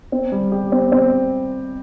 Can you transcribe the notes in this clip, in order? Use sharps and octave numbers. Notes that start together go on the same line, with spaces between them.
C4
G3
G4
C4
C4